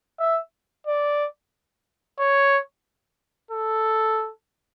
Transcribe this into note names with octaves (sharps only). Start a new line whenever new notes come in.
E5
D5
C#5
A4